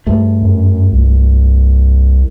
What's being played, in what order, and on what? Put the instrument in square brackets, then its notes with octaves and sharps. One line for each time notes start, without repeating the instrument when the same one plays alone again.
[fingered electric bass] G2 A3
[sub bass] F#2
C2